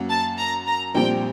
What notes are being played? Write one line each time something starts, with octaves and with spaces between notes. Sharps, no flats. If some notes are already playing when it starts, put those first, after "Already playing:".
Already playing: F#2 F#3 A#3 F#4
A5
A#5
A#5
A#1 A#2 G3 C4 G5